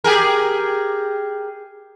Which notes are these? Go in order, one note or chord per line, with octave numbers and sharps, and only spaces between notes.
G4 G#4 A#4